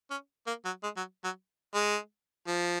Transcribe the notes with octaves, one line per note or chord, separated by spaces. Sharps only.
C#4
A#3
F#3
G#3
F#3
F#3
G#3
F3